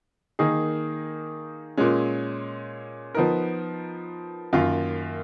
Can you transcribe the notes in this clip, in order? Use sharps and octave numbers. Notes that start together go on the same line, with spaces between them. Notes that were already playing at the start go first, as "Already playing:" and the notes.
D#3 A#3 D#4 G#4
A#2 G#3 C#4
F3 B3 D#4 A#4
F#2 D#3 A#3 F4